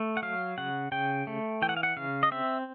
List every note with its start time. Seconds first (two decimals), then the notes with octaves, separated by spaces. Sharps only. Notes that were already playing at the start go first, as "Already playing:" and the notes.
Already playing: A3
0.17 F#5
0.22 F#3 F5
0.58 C#3 F#5
0.92 C#3 G5
1.27 A3
1.62 E3 G5
1.69 F#5
1.77 F5
1.83 F#5
1.97 C#3 F5
2.23 D#5
2.31 C4 E5